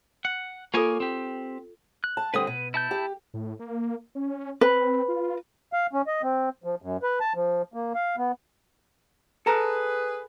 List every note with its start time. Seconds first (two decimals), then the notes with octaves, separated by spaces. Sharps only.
0.25 F#5
0.74 A#3 F4 A4 C#5 G#5
1.00 C4 G4
2.04 F#6
2.17 A5
2.34 D3 G3 C4 B4 D#6
2.47 B2 B4
2.74 E4 A5 G6
2.91 G4
3.34 A2
3.59 A#3
4.15 C#4
4.61 C4 B4
5.08 F4
5.73 F5
5.93 C#4
6.07 D#5
6.23 C4
6.64 F3
6.82 F#2
7.03 B4
7.20 A5
7.35 F3
7.74 A#3
7.95 F5
8.17 B3
9.46 G#4 A4 B4 A5 A#5